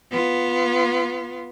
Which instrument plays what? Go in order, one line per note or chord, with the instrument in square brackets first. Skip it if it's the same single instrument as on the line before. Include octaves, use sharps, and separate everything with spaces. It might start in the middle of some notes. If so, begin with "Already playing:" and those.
[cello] B3 F4